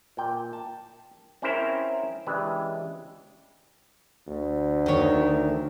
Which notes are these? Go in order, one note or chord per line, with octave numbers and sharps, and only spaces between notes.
A#2 G5
A5
C4 C#4 E4 G#4 A#4 C5
C#3 E3 G#3 D4 G4 B4
D2
D#3 C#5